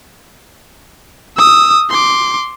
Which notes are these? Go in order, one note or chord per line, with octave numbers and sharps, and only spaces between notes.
D#6 E6
C6 D6